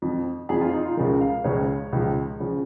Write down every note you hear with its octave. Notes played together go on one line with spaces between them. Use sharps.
F2 F3
F2 F3 G#4
F4
D#4
F4
C#2 C#3 F3 A#4
F5
C#2 C#3 F3 C#5
C#2 C#3 F3
C#3 F3